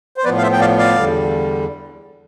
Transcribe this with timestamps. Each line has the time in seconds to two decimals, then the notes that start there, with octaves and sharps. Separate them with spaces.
0.17 C5
0.24 A2 F3 B3 B4 D5
0.37 F5
0.42 C5 E5
0.52 G5
0.60 D5 F5
0.78 D5 F5
0.96 E2 D3 G3